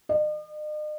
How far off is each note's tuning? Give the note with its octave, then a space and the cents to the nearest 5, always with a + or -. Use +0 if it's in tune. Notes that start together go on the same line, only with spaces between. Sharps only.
D#5 -45